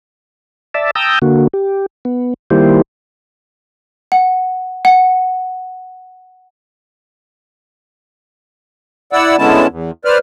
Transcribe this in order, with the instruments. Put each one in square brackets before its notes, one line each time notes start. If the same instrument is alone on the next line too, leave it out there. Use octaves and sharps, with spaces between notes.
[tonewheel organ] D5 E5 A5
G5 A5 A#5 D#6 E6 G6
D3 A#3 F#4
G4
B3
D#3 G3 A#3 E4 G4 C5
[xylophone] F#5
F#5
[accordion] E4 D5 F#5 E6
D3 G#3 B3 C#4 E4 A5
E2
B4 C5 D5 F6